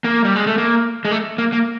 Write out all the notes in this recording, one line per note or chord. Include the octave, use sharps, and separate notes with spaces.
A#3
G3
G#3
A3
A#3
G#3
A3
A#3
A#3